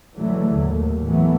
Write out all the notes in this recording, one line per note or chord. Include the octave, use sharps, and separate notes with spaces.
D3 E3 F#3 G#3 A3
D#2 A2
E3 F#3 A3 B3